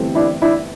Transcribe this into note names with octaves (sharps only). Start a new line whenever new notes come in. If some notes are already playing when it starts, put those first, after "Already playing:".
Already playing: G1 G2 E3 A3 C4
D4 E4
D4 E4